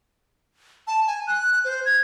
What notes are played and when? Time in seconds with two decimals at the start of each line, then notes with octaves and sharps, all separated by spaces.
0.87 A5
1.07 G#5
1.27 F#6
1.65 C5
1.85 G#6